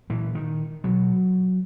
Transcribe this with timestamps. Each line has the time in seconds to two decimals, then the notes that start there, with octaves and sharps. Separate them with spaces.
0.10 A#2 E3
0.35 D#3
0.84 B2 F#3